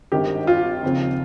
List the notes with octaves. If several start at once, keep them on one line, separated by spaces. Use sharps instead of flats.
G#1 G2 D#3 G4
F4
D#2 C#3 F3 C4